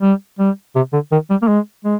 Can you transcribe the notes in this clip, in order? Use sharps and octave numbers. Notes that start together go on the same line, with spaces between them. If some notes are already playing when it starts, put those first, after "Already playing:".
G3
G3
C3
D3
D#3
G3
A#3
G#3
G#3